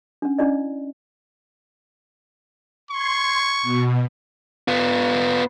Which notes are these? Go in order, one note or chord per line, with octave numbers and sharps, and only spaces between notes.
C#4 D4
C#4 D4 E4 D5 D#5
C6 C#6 G#6
B2
B3 F4